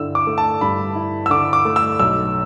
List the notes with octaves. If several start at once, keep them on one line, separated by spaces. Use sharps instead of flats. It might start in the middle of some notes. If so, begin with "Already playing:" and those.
Already playing: G2 D3 E4 E6
D6
A3
A5
G2 B5
E4
E6
D3 D6
D6
A3
E6
B1 E6